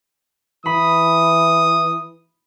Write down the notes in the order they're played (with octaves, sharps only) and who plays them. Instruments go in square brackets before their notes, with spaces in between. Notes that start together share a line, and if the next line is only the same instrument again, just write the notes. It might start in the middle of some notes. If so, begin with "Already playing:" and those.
[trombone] E3 [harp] B5 [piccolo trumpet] D#6